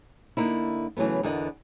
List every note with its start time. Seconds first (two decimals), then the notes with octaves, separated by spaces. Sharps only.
0.37 D3 A#3 D#4 E4
0.97 C#3 E3 F#3 A3 B3
1.23 E2 D3 B3 A#4 D#5 F#5